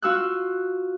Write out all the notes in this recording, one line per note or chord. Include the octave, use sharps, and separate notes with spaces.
F4 F#4 E6 F#6